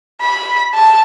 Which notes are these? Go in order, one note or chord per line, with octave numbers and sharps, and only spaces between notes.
B5
A5